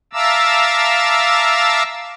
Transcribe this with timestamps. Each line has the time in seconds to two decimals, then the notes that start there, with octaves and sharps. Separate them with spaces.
0.13 E5 F5 A5 A#5 D6 E6